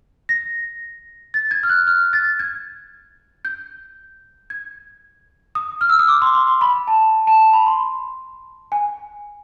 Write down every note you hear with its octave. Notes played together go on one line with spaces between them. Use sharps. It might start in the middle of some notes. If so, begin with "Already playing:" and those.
A#6
A6
G#6
F6
F#6
F6
A6
G#6
G6
G#6
D#6
F6
E6
D#6
D6
C6
C6
C6
B5
A5
A5
B5
C6
G#5